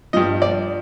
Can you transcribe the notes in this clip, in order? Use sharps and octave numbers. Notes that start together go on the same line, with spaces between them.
G2 F3 D#5
D5